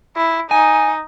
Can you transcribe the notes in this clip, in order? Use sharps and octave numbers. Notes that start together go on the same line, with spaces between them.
E4
D#4 G#5